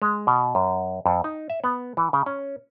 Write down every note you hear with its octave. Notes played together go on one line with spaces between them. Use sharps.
G#3
B2
F#2
F2
D#4
E5
B3
E3
C#3
C#4